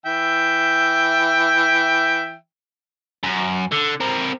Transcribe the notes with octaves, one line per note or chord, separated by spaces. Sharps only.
E3 E5 G5
F#2
D3
C4 A#4